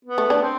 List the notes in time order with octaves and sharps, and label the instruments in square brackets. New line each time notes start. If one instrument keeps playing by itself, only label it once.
[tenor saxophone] B3
[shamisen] A3
D4
[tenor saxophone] C4